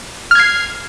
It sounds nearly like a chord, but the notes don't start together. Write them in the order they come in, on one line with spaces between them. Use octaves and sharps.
F6 G#6 C7